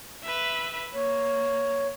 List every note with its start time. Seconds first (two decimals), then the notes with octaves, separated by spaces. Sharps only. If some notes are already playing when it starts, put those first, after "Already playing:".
0.23 B4 E5
0.94 A#3 C#5